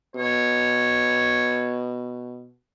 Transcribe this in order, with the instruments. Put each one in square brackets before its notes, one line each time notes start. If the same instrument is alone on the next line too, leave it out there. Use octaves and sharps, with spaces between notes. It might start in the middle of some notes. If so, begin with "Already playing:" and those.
[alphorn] B2 [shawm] C#5